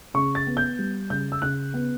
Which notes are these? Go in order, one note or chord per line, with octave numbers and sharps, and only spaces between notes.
C#3 C#6
A6
B3
G6
G3
C#3 G6
E6
C#3 F#6
B3